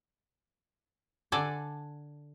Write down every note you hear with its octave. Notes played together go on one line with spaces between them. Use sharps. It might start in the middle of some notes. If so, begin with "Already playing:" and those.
D3 A4 D5 F#5 G#5 A5